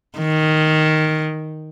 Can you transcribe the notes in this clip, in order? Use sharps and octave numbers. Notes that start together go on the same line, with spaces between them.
D#3